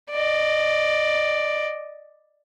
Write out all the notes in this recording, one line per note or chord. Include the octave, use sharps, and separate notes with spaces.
D5 D#5